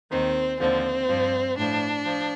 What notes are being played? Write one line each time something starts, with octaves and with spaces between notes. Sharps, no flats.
D#2 D#3 C4
D#2 D3 F3 C4
G2 F3
A2 F3 D4
F3